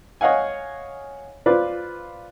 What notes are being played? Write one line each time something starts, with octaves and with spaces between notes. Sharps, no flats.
C#5 D#5 F5 F#5 G#5
F4 B4 C5 D5